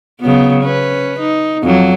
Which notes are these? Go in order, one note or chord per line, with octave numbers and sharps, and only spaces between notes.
C#3 F#3 B3
C#4 B4
D#4
F2 F#3